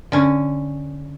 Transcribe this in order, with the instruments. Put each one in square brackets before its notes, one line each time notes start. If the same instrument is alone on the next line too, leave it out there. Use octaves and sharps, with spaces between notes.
[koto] D3 C#4